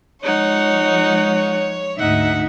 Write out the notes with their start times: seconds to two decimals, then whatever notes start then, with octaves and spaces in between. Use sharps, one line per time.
0.23 F3 G#3 D#4 C#5 F#5
1.99 D2 G#2 D#4 E5 F#5